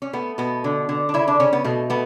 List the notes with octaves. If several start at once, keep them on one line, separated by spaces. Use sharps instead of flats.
C#4
A3 B3
B2 B3
D3
D3
D4
C#3 E4
D4
C#3 C#4
B3
B2 A3
A3 B3